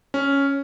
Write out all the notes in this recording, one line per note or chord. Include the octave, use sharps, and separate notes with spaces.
C#4